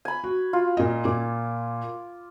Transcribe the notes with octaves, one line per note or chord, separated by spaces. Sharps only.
G#5 B5
F#4
F4
A#2 D#5
A#2 D6